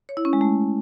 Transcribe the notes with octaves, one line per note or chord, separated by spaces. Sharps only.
C#5
E4
C#4
G#3
A3